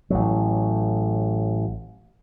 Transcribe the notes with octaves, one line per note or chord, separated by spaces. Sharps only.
A1 A2 F#3